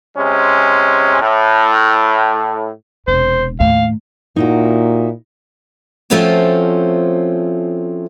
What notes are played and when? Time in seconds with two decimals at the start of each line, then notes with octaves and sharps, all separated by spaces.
0.18 C3 G#3 C#4
1.22 A2
3.07 E1 C3 C5
3.60 D#2 A2 F5
4.36 A#2 D#4 E4 F#4
6.10 F3 A3 C4 C#4 F4 F#4